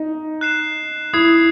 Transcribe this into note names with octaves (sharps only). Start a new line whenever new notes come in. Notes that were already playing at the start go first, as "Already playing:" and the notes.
Already playing: D#4
F#6 C7 E7
E4 D#6 G#6 C7